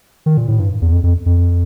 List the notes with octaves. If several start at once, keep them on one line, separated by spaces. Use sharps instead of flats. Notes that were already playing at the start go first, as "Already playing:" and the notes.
D#3
A#2
A2
G2
E2
F2
F2
F2